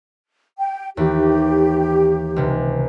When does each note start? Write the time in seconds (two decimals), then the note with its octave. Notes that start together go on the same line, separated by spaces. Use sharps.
0.59 G5
0.97 D#2 E3 G4
2.36 C#2 C3